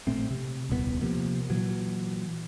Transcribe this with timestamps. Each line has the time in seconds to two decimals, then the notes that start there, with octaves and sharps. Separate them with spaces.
0.07 A#1 A2 A3 C4
0.31 C3
0.69 D#1 C2 A#2 B3
1.01 C3 F3 A#3
1.50 A#2 E3 F#3